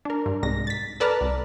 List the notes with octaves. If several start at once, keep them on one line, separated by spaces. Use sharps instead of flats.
D4 A#4
G2
C2 G#2 A#6
A6 B6
A4 B4 D5 A5 A#5 F6
C2